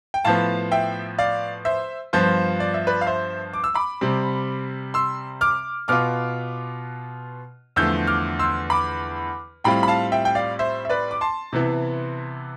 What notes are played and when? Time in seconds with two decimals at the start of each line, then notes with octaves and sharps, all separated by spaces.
0.14 G5
0.25 A2 F3 B3 F5 A5
0.72 E5 G5
1.18 D5 F5
1.65 C5 E5
2.13 G2 F3 B3 F4 C5
2.60 D5
2.74 E5
2.87 B4 D5
3.01 F5
3.07 C5 E5
3.53 D6
3.64 E6
3.75 B5 D6
4.01 C3 G3 C4
4.94 C6 E6
5.41 D6 F6
5.88 B2 B3 F4 D6 F6
7.76 E2 D3 F3 A3 E6 G6
8.07 D6 F6
8.39 C6 E6
8.70 B5 D6
9.64 A2 G3 C4 F4 G5 B5
9.83 B5
9.88 F5 A5
10.12 E5 G5
10.25 G5
10.35 D5 F5
10.59 C5 E5
10.85 E5
10.89 B4 D5
11.11 D6
11.21 A5 C6
11.53 C3 E3 B3 E4